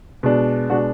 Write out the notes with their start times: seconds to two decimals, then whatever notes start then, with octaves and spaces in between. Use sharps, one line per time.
0.23 B2 G#3 D4
0.70 B2 G#3 D4 F#4